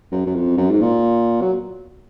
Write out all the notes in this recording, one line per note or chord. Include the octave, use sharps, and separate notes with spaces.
F#2
F#2
F2
F#2
G#2
A#2
F#3